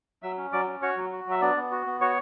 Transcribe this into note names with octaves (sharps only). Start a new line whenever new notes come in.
F#3 E5 E6
C#4
F#3 D5 D6
C#4
F#4 C#5 C#6
F#3
F#4
F#3 E5
B3 D4 D5
B3
F#4
B3
F#4 C#5 C#6